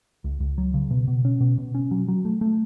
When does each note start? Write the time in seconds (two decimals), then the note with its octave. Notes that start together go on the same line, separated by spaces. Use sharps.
0.24 C#2
0.40 C#2
0.58 F#3
0.74 C#3
0.91 B2
1.07 B2
1.25 C#4
1.41 B2
1.58 B2
1.75 C#4
1.91 F#3
2.08 F#3
2.25 A3
2.41 A3